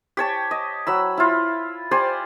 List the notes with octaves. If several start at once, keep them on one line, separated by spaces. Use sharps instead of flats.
G4 C#5 A5
D#5
F#3 B5 E6
E4 F4
G4 C5 D5 G#5